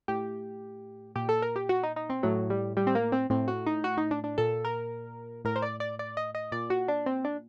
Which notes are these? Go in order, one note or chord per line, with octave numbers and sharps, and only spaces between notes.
A2 G4
A#2 G4
A4
A#4
G4
F#4
D#4
D#4
C4
A2 F#3
G3
G3
C4
A#3
C4
A2 C4
F#4
D#4
F#4
D#4
D4
D4
A#2 A4
A#4
A2 A#4
C5
D5
D5
D5
D#5
D#5
A#2 D5
F#4
D4
C4
D4